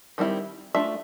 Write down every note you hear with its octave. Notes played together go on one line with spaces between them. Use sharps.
D#3 G3 C4 E4
A3 D4 F4 E5